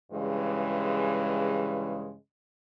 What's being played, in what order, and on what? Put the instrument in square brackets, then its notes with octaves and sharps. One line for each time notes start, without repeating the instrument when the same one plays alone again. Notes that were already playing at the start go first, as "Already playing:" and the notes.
[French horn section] G2 C#3 E3 G#3